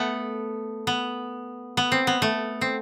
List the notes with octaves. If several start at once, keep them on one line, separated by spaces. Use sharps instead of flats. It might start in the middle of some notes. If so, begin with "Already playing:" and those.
Already playing: A3 B3
B3
B3
C4
B3
A3
C4